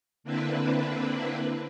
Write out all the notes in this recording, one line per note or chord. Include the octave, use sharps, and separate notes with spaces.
D3 A#3 C4 D4 E4 B4